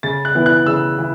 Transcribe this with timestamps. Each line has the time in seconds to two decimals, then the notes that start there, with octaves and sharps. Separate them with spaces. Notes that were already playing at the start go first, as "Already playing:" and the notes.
0.03 C#3 A6
0.25 F#6
0.35 E3 B3 E4
0.46 F#6
0.67 C#3 E6
0.98 E3